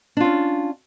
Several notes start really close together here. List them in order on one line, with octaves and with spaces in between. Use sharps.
D4 F4 C#4